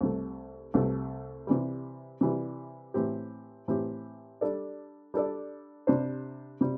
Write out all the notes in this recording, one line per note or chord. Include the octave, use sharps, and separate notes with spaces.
C2 C3 A3
C2 C3 A3
C3 E3 G3
C3 E3 G3
A2 E3 C4 G4
A2 E3 C4 G4
G3 D4 A4 D5
G3 D4 A4 D5
C3 G3 D4 C5
C3 G3